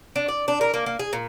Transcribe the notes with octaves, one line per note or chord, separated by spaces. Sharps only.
D4
D5
D4
A#4
A#3
A#3
G#4
A#2